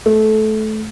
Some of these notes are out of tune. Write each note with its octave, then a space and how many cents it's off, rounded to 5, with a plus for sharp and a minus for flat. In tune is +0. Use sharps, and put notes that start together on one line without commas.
A3 -20